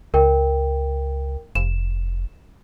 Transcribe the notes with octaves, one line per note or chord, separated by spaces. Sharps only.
C#2 A#4 G5
F1 E7